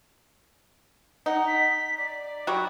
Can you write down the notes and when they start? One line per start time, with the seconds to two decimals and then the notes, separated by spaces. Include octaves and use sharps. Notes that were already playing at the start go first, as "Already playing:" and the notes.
1.26 D#4 F#5
1.47 B6
1.97 D5
2.47 F#3 G3 F#4